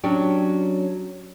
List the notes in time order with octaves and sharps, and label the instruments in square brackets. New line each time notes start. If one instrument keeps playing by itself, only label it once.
[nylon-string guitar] F#3 C#4 D4 G4